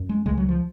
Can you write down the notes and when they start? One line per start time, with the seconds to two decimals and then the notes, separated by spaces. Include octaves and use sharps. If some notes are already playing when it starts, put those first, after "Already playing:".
Already playing: F#2
0.09 G#3
0.26 C#2 C#3 G#3
0.37 F#3
0.49 F3